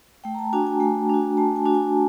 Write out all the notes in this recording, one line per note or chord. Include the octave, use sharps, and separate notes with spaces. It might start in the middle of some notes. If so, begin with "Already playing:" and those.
A3 G5
A#5
A5
D4 F#4 G#5
G#5
A3 G#5
D4 F#4
A3 A5
G#5
D4 F#4
G#5